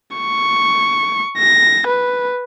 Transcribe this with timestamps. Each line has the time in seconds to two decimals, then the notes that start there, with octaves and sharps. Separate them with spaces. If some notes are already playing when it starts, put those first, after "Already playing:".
0.17 C#6
1.38 A#6
1.87 B4